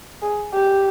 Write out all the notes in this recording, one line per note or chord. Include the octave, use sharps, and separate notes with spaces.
G#4
G4